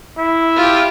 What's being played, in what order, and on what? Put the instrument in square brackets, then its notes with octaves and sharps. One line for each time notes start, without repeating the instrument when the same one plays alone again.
[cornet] E4
[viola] F4 G4